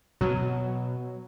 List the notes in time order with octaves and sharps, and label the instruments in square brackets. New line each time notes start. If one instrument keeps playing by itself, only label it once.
[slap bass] B2 B3 [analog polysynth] F#3